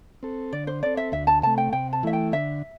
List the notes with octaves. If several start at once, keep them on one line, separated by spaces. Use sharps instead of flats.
C4 A4
D3 D5
C5
C4 A4 D5
E5
D2 E5
A5
C3 A3 A5
G5
C3 G5
A5
E3 A3 E4 E5
G5
D3 E5